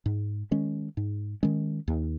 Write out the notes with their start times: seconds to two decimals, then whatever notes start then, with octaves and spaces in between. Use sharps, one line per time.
0.06 G#2
0.51 D#3 G#3 C#4
0.97 G#2
1.43 D#3 G#3 C#4
1.88 D#2